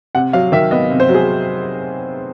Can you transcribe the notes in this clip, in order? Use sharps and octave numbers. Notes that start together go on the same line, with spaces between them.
C3 F#5
F#3 F5
D#3 E5
B3 D#5
C3
C5
F#3
G#4